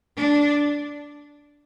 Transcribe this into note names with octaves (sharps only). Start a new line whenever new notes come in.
D4